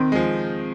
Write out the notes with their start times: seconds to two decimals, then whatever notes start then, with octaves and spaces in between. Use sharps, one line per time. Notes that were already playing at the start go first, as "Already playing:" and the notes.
Already playing: D#3 C4
0.12 G#3
0.15 F3